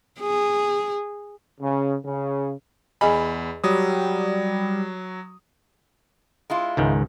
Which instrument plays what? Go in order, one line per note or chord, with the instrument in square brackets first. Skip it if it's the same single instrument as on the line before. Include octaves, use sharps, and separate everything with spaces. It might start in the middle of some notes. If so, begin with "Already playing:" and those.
[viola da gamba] G#4
[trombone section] C#3
C#3
[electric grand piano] E2 B5 [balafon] G#4 D#5 G#5
[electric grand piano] F#3 D#6 [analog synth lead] G3
[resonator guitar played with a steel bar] G#3 E4 F4
[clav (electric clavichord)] C#2 G#2 D#3